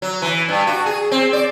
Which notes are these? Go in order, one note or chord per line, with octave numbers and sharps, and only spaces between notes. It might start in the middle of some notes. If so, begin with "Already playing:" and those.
F#3
E3
G2
F#4
G#4
C4
D5